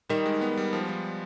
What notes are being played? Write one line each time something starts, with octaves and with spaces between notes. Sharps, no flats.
D#3 G3
G#3
B3
G3
F3
F3